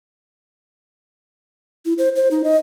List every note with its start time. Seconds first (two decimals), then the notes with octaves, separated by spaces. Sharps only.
1.85 E4
1.98 C5
2.16 C5
2.31 D#4
2.44 D#5